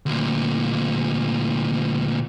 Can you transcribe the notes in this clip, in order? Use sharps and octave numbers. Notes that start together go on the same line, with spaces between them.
D2 A#2